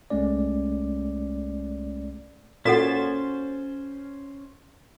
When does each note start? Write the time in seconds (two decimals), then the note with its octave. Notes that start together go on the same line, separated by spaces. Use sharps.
0.10 C2 G#3 A3 C#4 D5
2.65 A#2 C#4 F#4 A4 C5 F#5 A6 E7